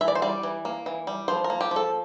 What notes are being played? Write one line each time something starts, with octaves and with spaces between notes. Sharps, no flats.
E3 E5
D5
C5
G3 D5
E3
A#3
E3
G3
F3 C5
A#4
A#3
G4
F3
A4